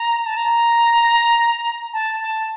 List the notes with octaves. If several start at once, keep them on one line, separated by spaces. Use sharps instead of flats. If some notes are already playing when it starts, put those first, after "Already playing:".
Already playing: A#5
A5
A#5
A5
A5